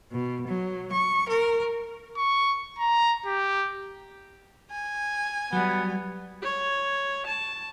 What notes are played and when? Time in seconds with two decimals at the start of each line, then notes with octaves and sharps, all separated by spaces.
0.11 B2
0.46 F#3
0.91 C#6
1.28 A#4
2.17 C#6
2.79 A#5
3.26 G4
4.72 G#5
5.53 F#3 G3 B3
6.42 C#5
7.27 A5